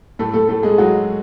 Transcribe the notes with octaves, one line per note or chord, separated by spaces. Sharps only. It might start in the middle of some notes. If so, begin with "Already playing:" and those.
A2 A3 A4
A3 A4
A2 A3 A4
G#3 G#4
F#3 G#3 F#4